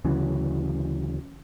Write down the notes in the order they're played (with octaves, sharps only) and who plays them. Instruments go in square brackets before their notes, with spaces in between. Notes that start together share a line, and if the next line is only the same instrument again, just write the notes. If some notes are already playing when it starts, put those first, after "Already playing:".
[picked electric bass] D2 C#3 E3 F#3